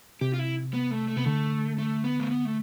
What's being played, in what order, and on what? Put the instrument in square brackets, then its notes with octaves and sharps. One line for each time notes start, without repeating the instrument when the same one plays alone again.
[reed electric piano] C3 [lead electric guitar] G4
[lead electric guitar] F4
E4
B3
A3
A3
[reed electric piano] C3 [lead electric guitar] B3
[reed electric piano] D3 [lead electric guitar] A3
[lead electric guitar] A3
B3
A3
B3
A3